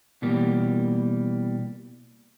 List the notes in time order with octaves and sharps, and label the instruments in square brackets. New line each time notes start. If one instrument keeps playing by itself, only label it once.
[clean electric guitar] B2 E3 G3 A#3